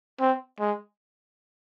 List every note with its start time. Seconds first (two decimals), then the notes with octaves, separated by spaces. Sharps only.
0.20 C4
0.60 G#3